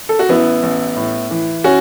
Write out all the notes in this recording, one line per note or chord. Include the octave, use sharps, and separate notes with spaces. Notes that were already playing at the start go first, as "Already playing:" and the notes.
A4
F#4
A1 B3 E4
A1
A2
E3
C#4 F#4